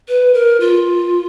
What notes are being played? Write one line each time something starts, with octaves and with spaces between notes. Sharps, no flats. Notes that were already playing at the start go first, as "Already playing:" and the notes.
B4
A#4
F4